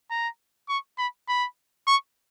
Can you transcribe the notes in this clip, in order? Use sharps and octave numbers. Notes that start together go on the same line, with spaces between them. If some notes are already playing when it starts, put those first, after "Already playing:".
A#5
C#6
B5
B5
C#6